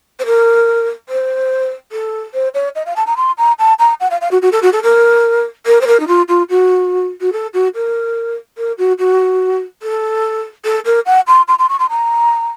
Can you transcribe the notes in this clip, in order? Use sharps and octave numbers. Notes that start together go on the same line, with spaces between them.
C5
A#4
C5
A4
C5
C#5
D#5
F5
A5
A#5
C6
A#5
A5
A#5
F#5
F5
F5
F#4
F#4
A4
F#4
A4
A#4
A#4
C5
A#4
D#4
F4
F4
F#4
F#4
A4
F#4
A#4
A#4
F#4
F#4
A4
A4
A#4
F#5
C6
C6
C6
C#6
C6
A#5